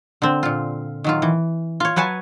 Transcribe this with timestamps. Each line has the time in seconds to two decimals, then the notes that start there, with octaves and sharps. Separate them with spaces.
0.22 D3 C4
0.43 A#2 F4
1.04 D#3 F#3 F4
1.22 E3
1.80 F4 C#5
1.96 F#3 B4 C#5 G#5 A5